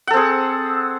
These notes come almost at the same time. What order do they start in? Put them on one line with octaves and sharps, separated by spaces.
F#5 A4 C4 G#4